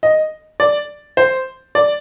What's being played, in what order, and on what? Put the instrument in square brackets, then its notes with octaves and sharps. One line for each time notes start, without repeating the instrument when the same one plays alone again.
[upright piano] D#5
D5
C5
D5